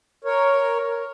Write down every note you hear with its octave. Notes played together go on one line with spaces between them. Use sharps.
A#4 C#5